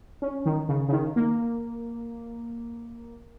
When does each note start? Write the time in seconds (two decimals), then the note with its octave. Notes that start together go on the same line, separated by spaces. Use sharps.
0.22 C#4
0.46 D#3
0.69 C#3
0.89 C#3
0.92 D#3
1.16 A#3